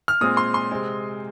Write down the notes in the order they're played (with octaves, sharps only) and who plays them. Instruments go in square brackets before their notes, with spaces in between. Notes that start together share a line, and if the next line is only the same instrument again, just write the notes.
[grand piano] F6
A#2 G#3 C4 D#6
C6
C6
C3 G#3 C4